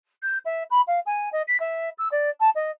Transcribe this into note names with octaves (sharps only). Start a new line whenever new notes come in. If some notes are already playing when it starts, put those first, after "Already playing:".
G6
E5
B5
F5
G#5
D#5
B6
E5
E6
D5
A5
D#5